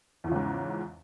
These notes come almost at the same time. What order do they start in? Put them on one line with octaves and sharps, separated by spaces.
E2 F3 C#3 G#2